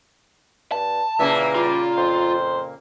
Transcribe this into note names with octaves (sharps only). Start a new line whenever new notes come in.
G2 A5
A#2 C#3 E3 A#3 E5
G3 F4
F2 C5